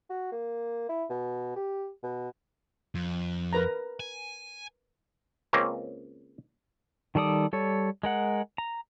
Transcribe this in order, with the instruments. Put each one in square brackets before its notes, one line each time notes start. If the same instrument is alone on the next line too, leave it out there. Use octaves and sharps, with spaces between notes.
[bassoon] F#4
A#3
E4
B2
G4
B2
[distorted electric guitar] F2
[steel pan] A#4 B4 A#5
[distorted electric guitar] G#5
[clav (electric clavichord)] C#2 A#3 C4 C#4
[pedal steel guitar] D#3 G3 A4 D5 D#6
G3 A4 C#5
G#3 A#4 F#5
A#5